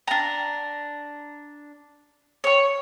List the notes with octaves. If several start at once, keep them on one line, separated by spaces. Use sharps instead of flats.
D4 A#5
C#5 C#6